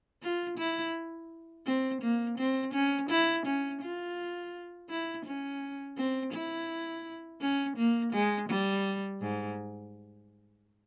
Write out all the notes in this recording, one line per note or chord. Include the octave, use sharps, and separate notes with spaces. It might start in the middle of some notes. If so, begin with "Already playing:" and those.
F4
E4
C4
A#3
C4
C#4
E4
C#4
F4
E4
C#4
C4
E4
C#4
A#3
G#3
G3
G#2